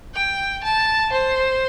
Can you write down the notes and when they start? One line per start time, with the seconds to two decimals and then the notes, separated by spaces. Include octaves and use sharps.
0.14 G5
0.63 A5
1.12 C5